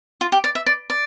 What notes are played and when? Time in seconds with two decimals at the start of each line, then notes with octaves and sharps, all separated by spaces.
0.21 F4
0.32 G4
0.44 D5
0.55 E5
0.66 D5
0.90 D5